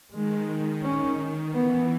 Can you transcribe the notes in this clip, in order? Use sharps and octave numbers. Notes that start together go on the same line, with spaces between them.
D#3 G#3
D#3
D#3 C#4
D#3
E3 B3